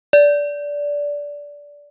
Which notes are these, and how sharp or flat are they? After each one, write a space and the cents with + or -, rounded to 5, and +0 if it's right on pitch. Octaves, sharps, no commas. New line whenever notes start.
D5 -15